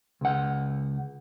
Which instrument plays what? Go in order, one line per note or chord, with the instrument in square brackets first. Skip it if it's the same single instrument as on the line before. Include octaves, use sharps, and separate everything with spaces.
[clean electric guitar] C#2 F#5